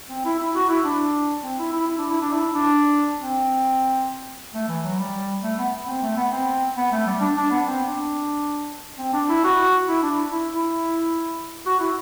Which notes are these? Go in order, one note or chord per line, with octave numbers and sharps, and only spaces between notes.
C4
E4
E4
F#4
E4
D4
C4
E4
E4
E4
D4
E4
D4
E4
D4
C4
A3
E3
F#3
G3
A3
B3
C4
A3
B3
C4
B3
A3
G3
D4
D4
B3
C4
D4
C4
D4
E4
F#4
E4
D4
E4
E4
F#4
E4